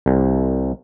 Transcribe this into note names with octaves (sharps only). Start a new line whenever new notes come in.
C2